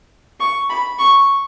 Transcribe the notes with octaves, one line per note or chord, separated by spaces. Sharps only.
C#6
B5
C#6